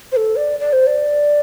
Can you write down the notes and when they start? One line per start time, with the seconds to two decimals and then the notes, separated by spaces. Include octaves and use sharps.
0.12 C5
0.17 A4
0.36 D5
0.60 D5
0.73 C5
0.87 D5